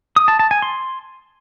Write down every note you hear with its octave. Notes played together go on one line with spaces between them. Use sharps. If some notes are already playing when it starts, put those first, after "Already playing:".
D#6
A5
A5
G#5
C6